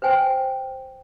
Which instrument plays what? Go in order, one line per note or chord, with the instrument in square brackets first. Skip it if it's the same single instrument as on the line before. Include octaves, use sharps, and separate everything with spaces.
[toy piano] B4 C5 G5 G#5